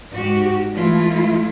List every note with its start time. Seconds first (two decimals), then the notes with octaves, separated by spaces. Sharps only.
0.12 G#2 F#4 G4
0.72 E3 G#3 A3 E4 F4